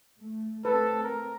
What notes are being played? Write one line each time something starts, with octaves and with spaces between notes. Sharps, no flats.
A3
A3 C4 A4 B4
A#4